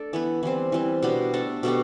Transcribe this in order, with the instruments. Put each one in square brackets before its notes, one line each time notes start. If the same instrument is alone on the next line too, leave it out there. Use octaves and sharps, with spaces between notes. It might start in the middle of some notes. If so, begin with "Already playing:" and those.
Already playing: [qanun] A3 D4 A4 D5
E3 B3 E4 B4
E3 G3 C4
E3 G3 C4
B2 B3 D4 G4
A3 D4 A4
B2 A3 D4 G4